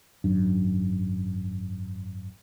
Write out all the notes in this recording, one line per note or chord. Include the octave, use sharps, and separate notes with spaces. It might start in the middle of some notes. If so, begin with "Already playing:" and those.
G#1 F#2 D4